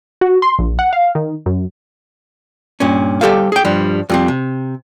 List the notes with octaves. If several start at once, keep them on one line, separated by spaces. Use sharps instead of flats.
F#4
C6
A#1
F#5
F5
D#3
F#2
G2 A#2 C#4
G3 G4 A4 C5 F5
G#4 G5
G2 F3 G3
F2 G3 C4
C3